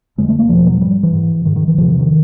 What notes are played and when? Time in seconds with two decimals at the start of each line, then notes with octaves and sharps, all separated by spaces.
0.18 F2 D3 G#3
0.29 A3
0.39 A#3
0.49 E2 B2 F3
0.66 F#3
0.81 G#2 G3
1.03 E3
1.13 G#2
1.45 G#2 D#3
1.56 D#3
1.68 E3
1.78 E2 C3 F3
1.89 E3
1.99 D#3